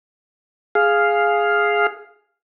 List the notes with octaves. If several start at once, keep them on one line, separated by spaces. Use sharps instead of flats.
G#4 F5